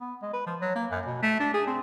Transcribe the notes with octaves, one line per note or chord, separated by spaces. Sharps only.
B3
G#3
B4
F3
F#3
A#3
F#2
B2
A3
D4
G#4
C4